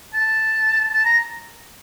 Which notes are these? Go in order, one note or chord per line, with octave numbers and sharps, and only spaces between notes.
A5
A5
A#5